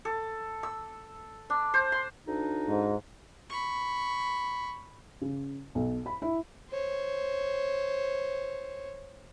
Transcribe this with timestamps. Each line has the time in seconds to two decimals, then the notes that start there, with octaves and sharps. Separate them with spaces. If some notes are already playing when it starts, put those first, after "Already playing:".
0.05 A4
0.63 E6
1.50 D4
1.74 C5
1.92 C6
2.27 D2 D4 D#4
2.68 G#2
3.50 B5 C#6
5.22 C#3
5.75 B1
6.06 B5
6.22 E4
6.70 C5 C#5